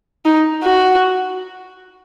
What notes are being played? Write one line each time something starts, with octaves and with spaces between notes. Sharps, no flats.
D#4
F#4